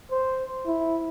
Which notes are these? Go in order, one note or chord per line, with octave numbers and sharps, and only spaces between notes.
C5
E4